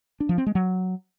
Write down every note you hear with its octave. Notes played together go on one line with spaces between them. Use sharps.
D4
F3
C4
G#3
F#3